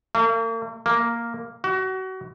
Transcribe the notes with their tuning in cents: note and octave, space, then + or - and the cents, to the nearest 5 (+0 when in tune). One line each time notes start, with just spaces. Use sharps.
A#3 -40
A#3 +0
F#4 +30